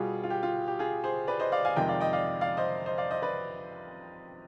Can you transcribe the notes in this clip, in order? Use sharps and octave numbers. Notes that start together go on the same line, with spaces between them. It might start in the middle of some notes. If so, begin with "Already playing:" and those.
Already playing: B2 G3 F4 G#4
F4
G4
F4
G4
F4 G#4
G#4 C5
B4 D5
C5 D#5
D5 F5
F5 G#5
F2 C3 D#3 G#3 D#5 G5
D5 F5
D#5 G5
D5 F5
D5 F5
C5 D#5
C5 D#5
D5 F5
C5 D#5
B4 D5